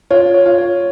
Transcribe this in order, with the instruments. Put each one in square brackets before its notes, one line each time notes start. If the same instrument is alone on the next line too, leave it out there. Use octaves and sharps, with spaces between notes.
[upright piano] F4 [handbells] C#5
[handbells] C#5
[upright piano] F4
[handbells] C#5